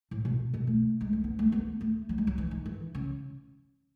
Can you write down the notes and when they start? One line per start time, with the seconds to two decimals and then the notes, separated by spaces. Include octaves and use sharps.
0.11 A2
0.25 B2
0.54 B2
0.67 A3
1.01 G#3
1.13 A3
1.24 B3
1.39 A3
1.52 B3
1.81 A3
2.09 F#3
2.18 G#3
2.27 F#3
2.38 E3
2.51 D#3
2.66 E3
2.95 C#3